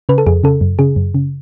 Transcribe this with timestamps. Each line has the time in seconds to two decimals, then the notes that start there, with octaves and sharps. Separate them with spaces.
0.09 C#3 B4
0.18 A4
0.27 F2 G#4
0.44 C#3 A4
0.61 F#2
0.79 C#3 G#4
0.96 F#2
1.14 C#3